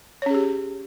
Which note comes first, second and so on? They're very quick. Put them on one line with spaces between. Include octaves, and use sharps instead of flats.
C#5 C#4 G#4 G4